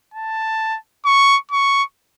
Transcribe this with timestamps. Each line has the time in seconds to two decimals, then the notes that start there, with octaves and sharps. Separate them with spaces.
0.14 A5
1.05 C#6
1.51 C#6